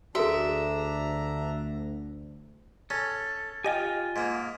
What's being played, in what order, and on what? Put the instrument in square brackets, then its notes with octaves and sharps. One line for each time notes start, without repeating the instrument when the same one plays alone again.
[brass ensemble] D2 [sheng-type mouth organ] D4 A#5 [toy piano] F#4 G#4 A4 [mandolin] E5
[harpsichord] C#4 [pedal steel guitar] A4
[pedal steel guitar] F4 G#5 [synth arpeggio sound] G4 D#5 G5
[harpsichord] G#2 A#3